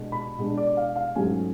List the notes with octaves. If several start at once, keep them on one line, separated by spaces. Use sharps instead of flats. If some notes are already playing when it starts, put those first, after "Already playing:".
Already playing: B2 G#3 D4
B5
B2 G#3 D4
D5
F5
F5
G#2 F#3 A3 C#4 G#5